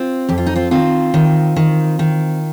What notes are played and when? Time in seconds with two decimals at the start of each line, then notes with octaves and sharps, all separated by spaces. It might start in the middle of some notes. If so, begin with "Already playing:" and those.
Already playing: C4 F4
0.29 F2 G4
0.38 F4
0.46 D#4
0.56 C4 F4
0.71 D#3 C4 F4
1.14 D#3
1.56 D#3
1.99 D#3